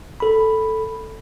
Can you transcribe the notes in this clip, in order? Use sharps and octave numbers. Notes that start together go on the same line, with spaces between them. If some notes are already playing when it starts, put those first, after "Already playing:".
A4 B5